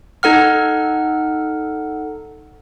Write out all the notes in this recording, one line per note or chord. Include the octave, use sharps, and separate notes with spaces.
D#4 A4 F#5 F6